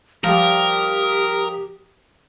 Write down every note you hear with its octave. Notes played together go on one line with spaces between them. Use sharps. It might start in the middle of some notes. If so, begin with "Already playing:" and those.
F3 G3 G4 A#4 D#6